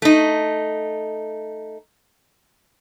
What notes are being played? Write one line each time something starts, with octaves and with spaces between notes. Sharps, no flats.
A3 D#4